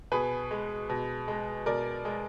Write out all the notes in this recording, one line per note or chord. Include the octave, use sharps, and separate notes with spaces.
B2 G#4 B4
G#3
B2
G#3
B2 A#4 D5
G#3